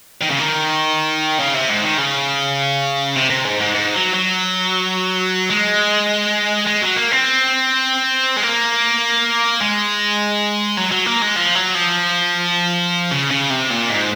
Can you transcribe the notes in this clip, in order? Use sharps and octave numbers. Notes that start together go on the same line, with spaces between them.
D#3
C#3
D#3
C#3
C3
G#2
D#3
C#3
C3
C3
G#2
G#2
G#2
F#3
F#3
G#3
G#3
F#3
A#3
C4
G#3
A#3
G#3
F#3
F#3
A#3
G#3
F3
F#3
F3
C#3
C#3
C3
A#2
G#2